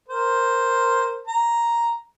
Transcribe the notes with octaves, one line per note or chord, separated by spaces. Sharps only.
A#4 C5
A#5